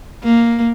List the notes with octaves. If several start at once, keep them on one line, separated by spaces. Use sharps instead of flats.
A#3